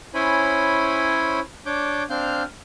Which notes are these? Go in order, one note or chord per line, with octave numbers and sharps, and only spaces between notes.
C#4 E4 C5 C#5 G#5 B5
D4 C#5 D6 G6
C4 D4 F5 F6 G6